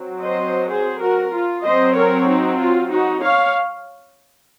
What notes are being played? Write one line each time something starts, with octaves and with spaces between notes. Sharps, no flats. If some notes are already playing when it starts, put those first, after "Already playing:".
Already playing: F#3 C4
C5 D#5
G#4 C5
F#4 A#4
F4
F#3 C4 C5 D#5
A#4 C#5
D#4
F4
D#4 F#4
C#5 F5